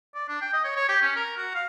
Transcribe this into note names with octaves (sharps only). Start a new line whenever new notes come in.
D5
D4
G5
D#5
C#5
C#5
G4
C#4
A#4
F#4
F5